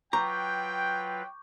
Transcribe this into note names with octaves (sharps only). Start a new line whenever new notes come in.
F#3 F4 B4 G5 A#5 C#6 D6 G6